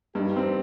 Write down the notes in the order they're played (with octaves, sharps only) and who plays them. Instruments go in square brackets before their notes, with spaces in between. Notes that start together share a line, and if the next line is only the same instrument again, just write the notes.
[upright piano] G2 [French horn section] D#4 G4
[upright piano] C4